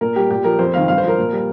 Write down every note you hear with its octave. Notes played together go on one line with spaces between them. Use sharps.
A#2 A#4
G3 G4
A#2 G4
F3 A#4
F2 C5
C3 D#3 F5
G2 F5
C5
F3 A#4
A#2
G3